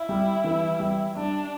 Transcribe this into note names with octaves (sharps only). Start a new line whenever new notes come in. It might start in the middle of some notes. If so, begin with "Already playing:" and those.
Already playing: E4
G3
E3
G3
G3 D4